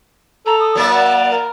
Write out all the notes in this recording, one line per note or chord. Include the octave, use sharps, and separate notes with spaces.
A4 A#5
D#6
F#3 A#3 D5 E5
D5 F#5
A#4